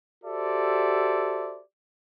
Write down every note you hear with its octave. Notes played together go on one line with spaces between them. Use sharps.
F#4 G4 A4 C5 D5 E5